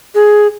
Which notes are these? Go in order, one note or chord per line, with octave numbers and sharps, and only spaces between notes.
G#4